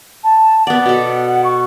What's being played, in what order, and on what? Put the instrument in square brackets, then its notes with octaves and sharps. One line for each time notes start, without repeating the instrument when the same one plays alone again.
[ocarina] A5
[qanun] B3 D5 [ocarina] F#5
[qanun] B2 A4
[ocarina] C#6